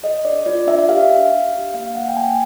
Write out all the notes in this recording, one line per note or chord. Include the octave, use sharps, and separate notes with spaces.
G#4 D#5
D4 D5
F4 D5
D4 E5
E5
G4 F5
D4
D4
G4
A#3 F5
A#3 F#5
G5
A#3 G#5